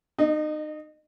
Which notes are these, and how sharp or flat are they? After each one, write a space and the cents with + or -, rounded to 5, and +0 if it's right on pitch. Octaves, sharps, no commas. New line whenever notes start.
D#4 -30 D#5 +0